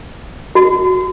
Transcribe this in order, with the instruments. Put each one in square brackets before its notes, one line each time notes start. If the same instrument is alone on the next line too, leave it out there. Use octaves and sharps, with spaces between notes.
[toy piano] F#4